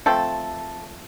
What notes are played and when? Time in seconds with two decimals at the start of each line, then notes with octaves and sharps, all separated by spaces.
0.06 F3 A3 C4 A4